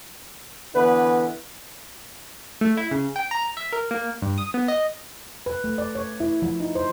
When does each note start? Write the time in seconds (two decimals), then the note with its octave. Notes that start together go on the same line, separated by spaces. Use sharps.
0.75 D3 E3 B3 B4
2.61 A3
2.77 E4
2.91 C#3
3.16 G5
3.31 A#5
3.57 E5
3.72 A#4
3.91 A#3
4.22 G2
4.38 D#6
4.54 B3
4.68 D#5
5.46 B4
5.64 A3
5.78 D5
5.95 C#5
6.20 E4
6.42 F3
6.60 D#4
6.75 C5